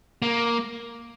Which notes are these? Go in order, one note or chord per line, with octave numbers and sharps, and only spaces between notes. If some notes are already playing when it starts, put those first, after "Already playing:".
A#3